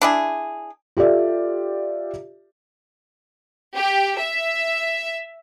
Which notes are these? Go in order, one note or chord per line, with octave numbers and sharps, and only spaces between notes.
D4 E4 G#4
F4 G4 A4 D5 E5
G4
E5